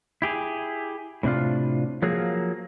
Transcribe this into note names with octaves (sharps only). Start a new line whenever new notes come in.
E4 G4 G#4
A2 C3 D4 F4
F3 F#3 A#3 G#4